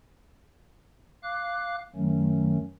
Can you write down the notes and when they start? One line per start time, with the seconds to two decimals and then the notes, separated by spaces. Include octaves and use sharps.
1.23 F5 D6 F#6
1.95 F#2 D#3 F#3 A3 C#4